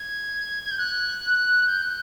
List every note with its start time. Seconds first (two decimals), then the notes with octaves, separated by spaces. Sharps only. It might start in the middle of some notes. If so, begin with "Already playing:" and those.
Already playing: G#6
0.63 G#6
0.70 G6
0.77 F#6
1.66 G6
1.81 F#6